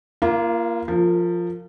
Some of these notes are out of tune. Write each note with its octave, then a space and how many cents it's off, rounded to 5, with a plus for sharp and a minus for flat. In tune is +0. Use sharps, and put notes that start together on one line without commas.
A#3 +10 F4 -35
F3 +0 A#4 -35